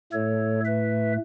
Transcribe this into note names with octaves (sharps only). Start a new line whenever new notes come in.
A2 A3 A4 C#5
B4 E5